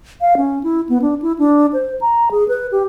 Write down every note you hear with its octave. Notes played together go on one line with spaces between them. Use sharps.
F5
C#4
E4
B3
D4
E4
D4
C5
A#5
G#4
B4
G4